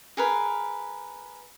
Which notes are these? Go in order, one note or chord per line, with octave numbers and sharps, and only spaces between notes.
G#4 A#4 B4